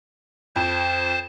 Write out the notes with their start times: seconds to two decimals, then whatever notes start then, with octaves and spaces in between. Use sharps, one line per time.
0.56 F2 C5 A5